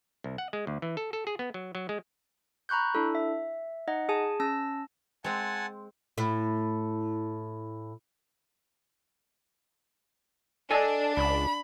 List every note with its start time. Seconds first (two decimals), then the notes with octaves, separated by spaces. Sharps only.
0.24 C2
0.38 F#5
0.53 G#3
0.67 D2
0.82 E3
0.97 A4
1.13 A4
1.27 G#4
1.39 B3
1.54 F#3
1.75 F#3
1.89 G#3
2.69 A#5 B5 C#6 F#6 G6
2.95 D4 E4 A4
3.15 E5
3.88 D#4 D#5 F#5
4.09 G#4 G#5 A5
4.40 C#4 A5 E6 A#6
5.24 G#3 C4 F#5 G#5 A5
6.18 A2 E4
10.71 D4 A4 D#5 G#5
11.17 C#2 B5